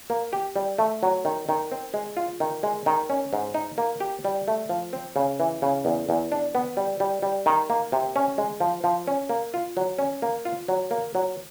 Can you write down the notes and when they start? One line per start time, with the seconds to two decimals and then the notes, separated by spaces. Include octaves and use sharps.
0.10 A#3
0.33 G4
0.56 G3
0.78 A3
1.03 F#3
1.25 D#3
1.49 D#3
1.72 C4
1.94 G#3
2.17 F4
2.40 D#3
2.63 G#3
2.86 D#3
3.10 C#4
3.33 G#2
3.54 D#4
3.78 A#3
4.00 G4
4.25 G3
4.48 A3
4.69 F3
4.93 C4
5.16 C#3
5.40 E3
5.62 C#3
5.85 E2
6.09 E2
6.32 D4
6.55 B3
6.77 G3
7.00 G3
7.22 G3
7.46 D#3
7.70 A#3
7.92 C3
8.16 C#4
8.38 G#3
8.60 F3
8.84 F3
9.07 C#4
9.29 A#3
9.54 F4
9.77 F#3
9.99 C#4
10.22 A#3
10.45 F4
10.68 F#3
10.91 A#3
11.15 F#3